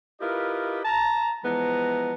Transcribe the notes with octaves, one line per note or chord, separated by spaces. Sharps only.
E4 F4 G4 A#4 B4 D#5
A5 A#5
E3 F3 G#3 B3 A5 A#5